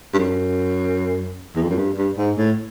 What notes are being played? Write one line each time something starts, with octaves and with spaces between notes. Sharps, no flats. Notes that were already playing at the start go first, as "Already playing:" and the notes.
G2
F#2
E2
F2
F#2
G2
G2
G#2
A2